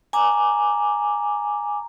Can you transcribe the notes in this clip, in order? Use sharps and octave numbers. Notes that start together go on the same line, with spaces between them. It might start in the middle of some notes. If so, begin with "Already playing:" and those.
G#5 A#5 D6